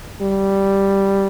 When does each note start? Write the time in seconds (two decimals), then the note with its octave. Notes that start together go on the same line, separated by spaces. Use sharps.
0.21 G3